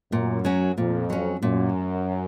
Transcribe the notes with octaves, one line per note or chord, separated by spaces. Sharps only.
F#2 A#2
F#3 C#4
F2 A#2
F#3 C#4
F#2 A#2